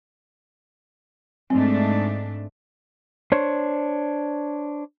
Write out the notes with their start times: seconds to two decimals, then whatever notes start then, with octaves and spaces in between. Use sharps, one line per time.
1.50 G#2 A3 C4 D4
3.32 D4 C5 C#5